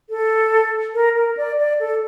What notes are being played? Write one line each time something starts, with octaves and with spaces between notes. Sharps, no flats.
A4
A#4
A#4
D5
D5
A4